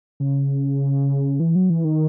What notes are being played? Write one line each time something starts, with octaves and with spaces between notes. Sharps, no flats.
C#3
E3
F#3
E3
D#3